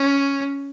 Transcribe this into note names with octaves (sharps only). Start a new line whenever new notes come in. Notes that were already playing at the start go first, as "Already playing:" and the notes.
Already playing: C#4